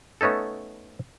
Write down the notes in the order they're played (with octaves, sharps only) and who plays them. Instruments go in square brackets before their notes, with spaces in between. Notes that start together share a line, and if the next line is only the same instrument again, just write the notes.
[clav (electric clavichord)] A3 B3 C#4 D#4 A4